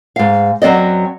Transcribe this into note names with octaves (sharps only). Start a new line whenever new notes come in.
G#2 F5
F#2 F#3 C4 D5 D#5